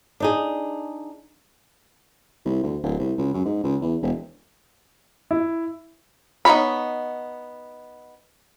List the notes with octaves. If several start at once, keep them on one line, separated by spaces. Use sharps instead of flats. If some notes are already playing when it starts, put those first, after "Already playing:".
D4 D#4 G#4
C2
D2
D1
C2
C#2
F#2
G#2
C#2
E2
E1
E4
B3 D#4 F4 C#5 B5